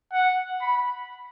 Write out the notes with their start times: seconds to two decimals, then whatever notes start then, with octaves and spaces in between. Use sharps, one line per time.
0.13 F#5
0.61 B5